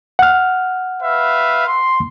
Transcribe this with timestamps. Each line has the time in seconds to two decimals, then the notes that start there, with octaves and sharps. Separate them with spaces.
0.19 F#5 F6
1.02 B4 E5 F5
1.66 C6